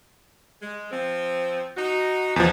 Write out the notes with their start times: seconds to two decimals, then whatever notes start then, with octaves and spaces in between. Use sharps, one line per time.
0.62 G#3
0.91 F3 C4
1.77 D#4 F#4
2.36 E2 F3 D#4 G#4